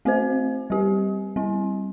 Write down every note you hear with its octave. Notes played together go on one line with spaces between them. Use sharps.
A3 C4 F#4 C5
G3 C4 G4
G3 C4 E4